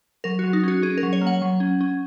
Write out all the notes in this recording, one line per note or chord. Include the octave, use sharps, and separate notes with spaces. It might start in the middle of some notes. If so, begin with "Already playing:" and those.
F#3 A#4
F#3 F#4
D#4
C#4 F#4
C#4 G#4
A#4
F#3
C#5
A#3
F#5
F#3
C#4
C#4